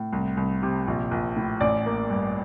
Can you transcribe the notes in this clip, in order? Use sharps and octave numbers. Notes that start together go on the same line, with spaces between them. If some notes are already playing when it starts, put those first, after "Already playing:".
Already playing: A2
C2
C2
C3
A#1
A#1
A2
A1 D5
A#3
G2